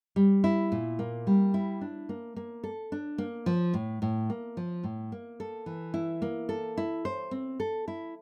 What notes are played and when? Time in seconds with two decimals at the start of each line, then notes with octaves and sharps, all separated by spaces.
0.16 G3
0.44 E4
0.72 A#2
0.99 A#3
1.27 G3
1.54 E4
1.81 D4
2.09 A#3
2.36 A#3
2.64 A4
2.92 D4
3.18 A#3
3.46 F3
3.74 A2
4.02 A2
4.30 A#3
4.57 F3
4.84 A2
5.12 A#3
5.40 A4
5.66 E3
5.94 E4
6.22 A#3
6.49 A4
6.78 E4
7.05 C5
7.31 C4
7.60 A4
7.88 E4